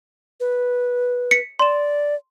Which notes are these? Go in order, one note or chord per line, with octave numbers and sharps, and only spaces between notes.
B4
B6 C#7
D5 C6 E7